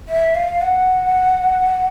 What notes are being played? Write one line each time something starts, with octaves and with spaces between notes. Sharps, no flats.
E5
F5
F#5